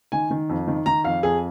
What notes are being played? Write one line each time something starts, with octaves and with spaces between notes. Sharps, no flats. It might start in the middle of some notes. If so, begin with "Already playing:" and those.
D#3 G#5
D#3
F2
D#3
D#3 A#5
F2 F5
F2 G#4